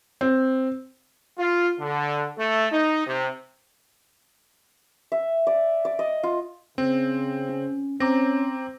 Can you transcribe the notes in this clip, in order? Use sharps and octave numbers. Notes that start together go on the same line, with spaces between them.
C4
F4
D3
A3
D#4
C3
E5
D5
D5
D#5
F4
C#3 C4
C#4
C4 C#4 A#5 D6 A#6